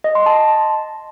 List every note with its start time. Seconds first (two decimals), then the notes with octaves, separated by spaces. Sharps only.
0.04 D#5
0.15 C6
0.26 A5